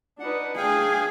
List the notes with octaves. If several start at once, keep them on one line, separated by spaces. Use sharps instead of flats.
D4 D#4 B4 F#5
A3 D4 G#4 F5 G5 G#5